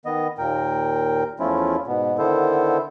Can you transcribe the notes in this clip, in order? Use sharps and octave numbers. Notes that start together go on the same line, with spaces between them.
D#3 B3 D#5
D#2 A#2 A#4 G5
E2 F3 A3 C#4 E4 F4
G#2 B2 B3
D3 D#3 B3 E4 A4 C5